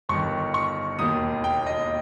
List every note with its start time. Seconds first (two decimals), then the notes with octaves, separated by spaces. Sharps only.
0.09 G1 G2 D#3 C#6
0.54 C#6
0.99 E1 D#2 D#3 D#6
1.44 G5
1.66 D#5